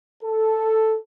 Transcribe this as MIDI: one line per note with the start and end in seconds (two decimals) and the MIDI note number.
0.22 0.97 69